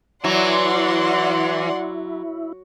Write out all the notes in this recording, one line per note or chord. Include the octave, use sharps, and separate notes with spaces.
E3 F#3 E4 D5 F#5 C6